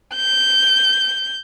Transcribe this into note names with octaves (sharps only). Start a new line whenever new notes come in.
G6